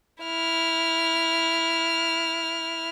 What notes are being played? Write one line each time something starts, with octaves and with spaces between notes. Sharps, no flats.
E4 F6